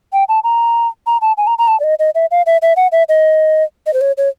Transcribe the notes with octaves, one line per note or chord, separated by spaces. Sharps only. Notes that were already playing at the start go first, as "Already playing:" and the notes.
G5
A5
A#5
A#5
A5
G#5
A#5
A#5
A5
D5
D#5
D#5
E5
F5
E5
E5
F#5
E5
D#5
D#5
C5
C#5
C#5